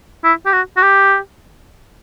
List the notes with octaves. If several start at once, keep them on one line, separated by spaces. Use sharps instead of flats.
E4
G4
F#4
F#4
G4